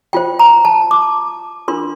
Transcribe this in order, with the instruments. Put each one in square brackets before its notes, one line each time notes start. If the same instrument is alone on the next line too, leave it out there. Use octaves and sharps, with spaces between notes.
[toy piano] F4 C5 G5
A#5
A5
D6
D4 F4 A#4 C6